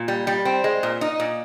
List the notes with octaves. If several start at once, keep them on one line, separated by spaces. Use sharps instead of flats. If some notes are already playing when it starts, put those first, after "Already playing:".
Already playing: A#2
G3
G3
C4
G#3
A#2
D#4
A#2